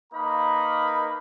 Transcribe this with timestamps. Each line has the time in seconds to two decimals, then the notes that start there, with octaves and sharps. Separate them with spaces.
0.13 A#3 D#4 A#4 B4 A#5 B5